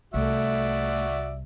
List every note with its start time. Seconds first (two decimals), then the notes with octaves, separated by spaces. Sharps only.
0.14 C2 A3 F#4 D5 E5